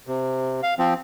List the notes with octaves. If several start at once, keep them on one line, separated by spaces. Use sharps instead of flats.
C3
F5
F3 C4